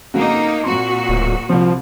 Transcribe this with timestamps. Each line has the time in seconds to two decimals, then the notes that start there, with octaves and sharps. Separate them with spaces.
0.14 F2 C#3 A#3 D#4 F#4
0.64 A#2 C4 F#4 A#5 C6
1.09 D1
1.49 C2 F3 C4